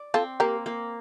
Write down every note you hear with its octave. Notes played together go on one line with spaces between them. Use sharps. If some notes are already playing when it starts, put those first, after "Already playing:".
Already playing: D5
C4 F4 A4
A#3 G4 A#4
A#3